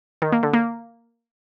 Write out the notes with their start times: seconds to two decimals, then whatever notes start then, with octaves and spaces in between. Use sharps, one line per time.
0.22 D#3
0.32 A#3
0.43 D3
0.53 A#3